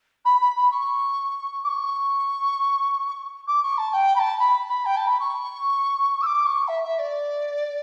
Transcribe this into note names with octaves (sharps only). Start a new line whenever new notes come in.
B5
B5
B5
C#6
D6
C#6
D6
C#6
A5
G5
B5
A5
B5
B5
G5
A5
B5
C#6
E6
D6
C#6
E5
E5
D5